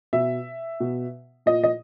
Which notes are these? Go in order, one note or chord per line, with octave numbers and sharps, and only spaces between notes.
B2 E5
B2
A#2 D#5
D#5